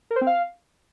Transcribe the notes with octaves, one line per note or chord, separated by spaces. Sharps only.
A#4
C5
C4
F5